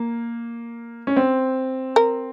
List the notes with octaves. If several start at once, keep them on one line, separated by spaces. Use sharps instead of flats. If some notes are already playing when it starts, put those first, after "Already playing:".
Already playing: A#3
C#4
C4
A#4